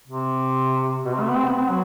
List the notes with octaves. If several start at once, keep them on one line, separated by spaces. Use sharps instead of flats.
C3
B2
C3
A3
B3
C4
B3
C4
F#3